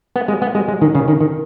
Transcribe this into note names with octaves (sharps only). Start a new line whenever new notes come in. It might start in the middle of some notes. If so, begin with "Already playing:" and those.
B3
G#3
B3
G#3
G#3
D#3
C#3
D#3
D#3